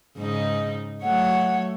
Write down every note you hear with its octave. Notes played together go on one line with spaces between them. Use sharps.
G#2 C#3 D#4
F#3 A3 C#5 F#5